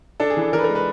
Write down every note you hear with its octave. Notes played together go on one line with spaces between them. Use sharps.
D4 A4
G#4
E3 A4
E3 A#4
B4
A#4
G#3
B4